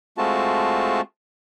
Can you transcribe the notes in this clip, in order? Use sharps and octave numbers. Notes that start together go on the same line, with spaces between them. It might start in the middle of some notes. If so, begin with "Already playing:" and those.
G#3 A3 C4 F4 F#4 A5